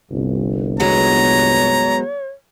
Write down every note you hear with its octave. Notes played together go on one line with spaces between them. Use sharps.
G1 C2
F#3 G#3 B3 C#5 A#5